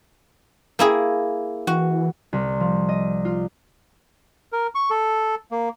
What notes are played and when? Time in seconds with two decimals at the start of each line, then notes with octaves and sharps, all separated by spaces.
0.79 A#3 E4 G#4
1.67 E3 F#4
2.33 C2
2.60 F3
2.89 D#5
3.25 F4
4.52 A#4
4.75 C#6
4.90 A4
5.51 A#3